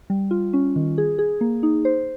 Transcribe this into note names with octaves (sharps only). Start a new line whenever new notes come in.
G3
F4
C#4
D#3
G#4
G#4
A#3
D#4
C5